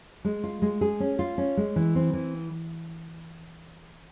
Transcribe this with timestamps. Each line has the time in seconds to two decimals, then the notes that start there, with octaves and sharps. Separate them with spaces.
0.25 G#3
0.44 F4
0.62 G#3
0.81 G#4
1.00 C#4
1.19 F4
1.38 C#4
1.57 G#3
1.76 E3
1.95 C4
2.14 E3